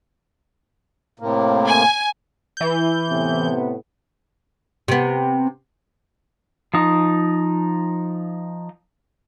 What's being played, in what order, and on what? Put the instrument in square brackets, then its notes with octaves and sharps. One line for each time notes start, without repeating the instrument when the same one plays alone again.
[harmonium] A2 C3 A#3
[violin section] G#5
[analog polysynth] E3 G6
[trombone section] A2 C3 B3
[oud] C3 B3
[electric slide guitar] F3 D#4